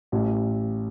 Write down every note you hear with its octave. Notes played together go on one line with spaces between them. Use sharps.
A1